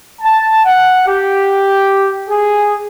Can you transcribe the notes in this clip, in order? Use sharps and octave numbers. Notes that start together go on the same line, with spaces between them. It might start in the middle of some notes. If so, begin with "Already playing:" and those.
A5
F#5
G4
G#4